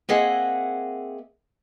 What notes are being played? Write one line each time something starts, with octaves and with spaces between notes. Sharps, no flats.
A#3 C4 G#4 D#5 E5 F#5